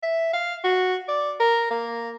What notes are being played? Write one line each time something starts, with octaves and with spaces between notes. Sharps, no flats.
E5
F5
F#4
D5
A#4
A#3